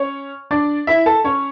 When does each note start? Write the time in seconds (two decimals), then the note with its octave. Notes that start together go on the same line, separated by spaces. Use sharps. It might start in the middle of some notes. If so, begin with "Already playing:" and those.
Already playing: C#4 C#5
0.51 D4 D5
0.87 E4 E5
1.06 A4 A5
1.24 C#4 C#5